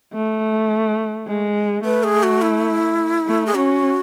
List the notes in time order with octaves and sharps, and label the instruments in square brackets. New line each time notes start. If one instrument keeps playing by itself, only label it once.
[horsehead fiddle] A3
G#3
[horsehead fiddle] A3 [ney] B4
[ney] G#4
F#4
E4
[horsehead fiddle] A3
[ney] G#4
[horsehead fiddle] C#4 [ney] F#4